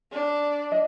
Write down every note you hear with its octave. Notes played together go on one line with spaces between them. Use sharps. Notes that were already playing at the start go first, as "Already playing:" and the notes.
D4
D#5